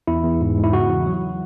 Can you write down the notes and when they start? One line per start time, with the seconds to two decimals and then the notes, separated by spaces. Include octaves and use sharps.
0.07 E2 E4
0.24 E2
0.41 G#2
0.57 G#2
0.64 E4
0.73 C#3 F#4
0.90 E3
1.06 F#3